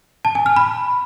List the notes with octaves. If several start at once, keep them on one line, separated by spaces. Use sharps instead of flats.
A5
G#5
F6
B5